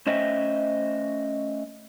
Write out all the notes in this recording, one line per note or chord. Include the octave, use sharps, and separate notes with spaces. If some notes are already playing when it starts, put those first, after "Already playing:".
A3 C#4 C5 D#5 E5 G5